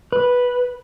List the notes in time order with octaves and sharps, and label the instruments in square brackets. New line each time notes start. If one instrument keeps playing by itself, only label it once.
[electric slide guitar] B4